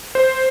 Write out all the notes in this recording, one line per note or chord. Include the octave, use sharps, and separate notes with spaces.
C5